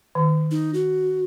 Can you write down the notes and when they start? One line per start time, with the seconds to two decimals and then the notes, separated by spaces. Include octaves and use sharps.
0.15 D#3
0.51 D#4
0.74 F#4